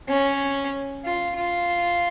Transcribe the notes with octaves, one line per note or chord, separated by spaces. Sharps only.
C#4
F4
F4